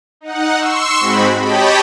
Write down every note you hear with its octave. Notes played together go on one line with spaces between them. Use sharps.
D#4 F#5
C6 C#6 E6
G#2 G#3 C4 F#4 B5
G4 C#5 D#5 G5 A5 B5